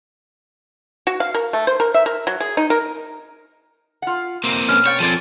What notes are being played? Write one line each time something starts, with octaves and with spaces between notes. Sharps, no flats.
F#4
F5
A#4
A3
C5
A#4
E5
A#4
F#3
G#4
D#4
A#4
F4 F#5
F2 C3 A#3 C4
B2 C#4 F6
C#5 D5 F5 G5
F3 C4 A4 D5 G#5